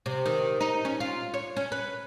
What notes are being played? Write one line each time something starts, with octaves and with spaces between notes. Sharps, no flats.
C3
D#3
D#4
C#4
F4
C#5
C#4
B4